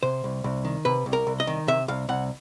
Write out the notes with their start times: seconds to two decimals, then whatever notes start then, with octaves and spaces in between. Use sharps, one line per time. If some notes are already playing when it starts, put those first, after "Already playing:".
0.03 C3 C5
0.24 C2
0.44 C2
0.65 D#3
0.85 C3 B4
1.06 C2
1.13 A#4
1.27 C2
1.40 D#5
1.47 D#3
1.68 C3 E5
1.88 C2 F5
2.09 C2 F#5